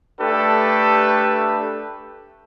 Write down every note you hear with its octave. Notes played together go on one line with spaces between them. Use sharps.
A3 D4 G4 A4 B4